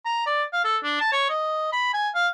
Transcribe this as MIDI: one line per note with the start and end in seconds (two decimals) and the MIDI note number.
0.05 0.23 82
0.27 0.43 74
0.53 0.64 77
0.64 0.77 69
0.83 0.96 62
1.01 1.10 81
1.12 1.28 73
1.29 1.70 75
1.73 1.90 83
1.94 2.09 80
2.15 2.28 77